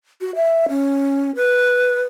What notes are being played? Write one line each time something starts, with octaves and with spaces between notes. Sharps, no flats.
F#4
E5
C#4
B4